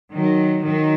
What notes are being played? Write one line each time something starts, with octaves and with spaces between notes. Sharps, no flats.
D#3 F#3
D#3 F#3